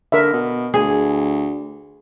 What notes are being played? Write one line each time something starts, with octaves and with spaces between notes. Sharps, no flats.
D3 A#4 E5
B2
D2 G#4